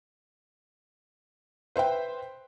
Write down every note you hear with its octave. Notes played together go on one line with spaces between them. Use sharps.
B4 C5 E5 G5